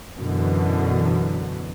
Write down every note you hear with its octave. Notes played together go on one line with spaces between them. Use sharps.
F#2 B2 D3 E3